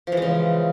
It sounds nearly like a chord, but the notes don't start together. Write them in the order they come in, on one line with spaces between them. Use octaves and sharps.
F3 E3 G#3 C#3